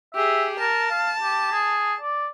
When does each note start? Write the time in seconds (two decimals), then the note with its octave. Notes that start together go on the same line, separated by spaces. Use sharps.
0.14 G4 G#4 E5
0.59 A#4 A5
0.90 F5
1.22 G4
1.52 G#4
2.01 D5